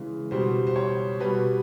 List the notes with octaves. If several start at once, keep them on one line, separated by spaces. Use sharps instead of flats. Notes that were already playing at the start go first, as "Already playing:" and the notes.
Already playing: C#3 E3 G#3 B4
B2 G3 C5
C5
C#5
B2 G3 B4